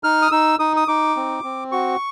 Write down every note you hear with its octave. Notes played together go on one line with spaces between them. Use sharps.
D#4 F6
D#6
D#4 E6
D#4 D#6
D#6
D#4 D6
C4
C4
F#4 C#6